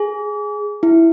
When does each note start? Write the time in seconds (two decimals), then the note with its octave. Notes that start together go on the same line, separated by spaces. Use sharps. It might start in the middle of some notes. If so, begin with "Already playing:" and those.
Already playing: G#4
0.83 E4